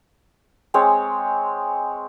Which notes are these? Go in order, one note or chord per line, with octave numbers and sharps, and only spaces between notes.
G#3 C4 G#4 C#5